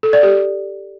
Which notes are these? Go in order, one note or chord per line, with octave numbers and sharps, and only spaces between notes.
A4
D5
G4